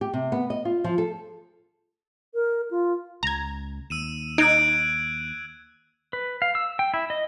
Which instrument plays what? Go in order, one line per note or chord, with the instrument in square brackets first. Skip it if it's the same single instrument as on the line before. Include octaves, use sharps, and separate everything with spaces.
[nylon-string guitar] G4
C3
B3
D#5
F4
F3
A4
[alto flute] A#4
F4
[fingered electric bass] C#2 [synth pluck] A#5 G#6
[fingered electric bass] D#2 [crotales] E6 D#7 E7
[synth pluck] D#4 [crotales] E6 F#6 G#6 [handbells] D7
[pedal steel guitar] B4
F5
E6
G5
E4
D#5